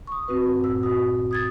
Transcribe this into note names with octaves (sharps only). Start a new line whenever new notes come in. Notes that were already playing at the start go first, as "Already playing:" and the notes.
C#6 D#6
G2 C4 F#4 B4
A#2 E6
F#4 D#6
D#6 G#6 A6